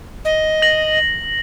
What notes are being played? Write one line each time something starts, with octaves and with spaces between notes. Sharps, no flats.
D#5
A#6 F#7